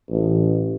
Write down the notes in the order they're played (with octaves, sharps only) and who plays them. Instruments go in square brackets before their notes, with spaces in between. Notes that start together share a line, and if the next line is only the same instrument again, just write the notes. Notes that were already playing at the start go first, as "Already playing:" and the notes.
[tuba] A1